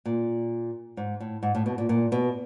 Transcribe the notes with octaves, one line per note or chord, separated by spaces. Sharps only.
A#2
G#2
A2
G#2
A2
B2
A#2
A#2
B2